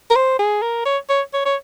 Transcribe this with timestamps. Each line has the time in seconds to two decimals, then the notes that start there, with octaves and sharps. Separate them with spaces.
0.10 A#4
0.15 C5
0.39 G#4
0.62 A#4
0.85 C#5
1.09 C#5
1.33 C#5
1.45 C#5